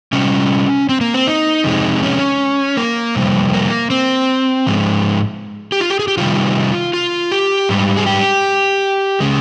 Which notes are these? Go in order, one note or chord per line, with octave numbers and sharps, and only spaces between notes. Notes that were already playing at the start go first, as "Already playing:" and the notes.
C3 G3 C#4
C4
A#3
C4
D#4
F2 C3 G#3
C#4
A#3
F2 C3 G3
A#3
C4
G#2 F3 G#3
G4
F4
G4
G#4
G4
C3 D#3 G3 F4
F4
G4
G#2 G3
G#4
G4
C#3 G#3